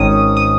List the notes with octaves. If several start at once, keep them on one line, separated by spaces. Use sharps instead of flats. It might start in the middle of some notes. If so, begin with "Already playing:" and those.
Already playing: G#1 G#2 D#3 C#4 D#6
D#6